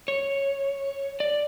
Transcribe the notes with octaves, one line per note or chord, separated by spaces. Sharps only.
C#5
D5